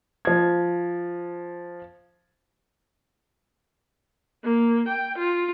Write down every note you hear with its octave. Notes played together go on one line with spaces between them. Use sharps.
F3 G#6
A#3
G5
F4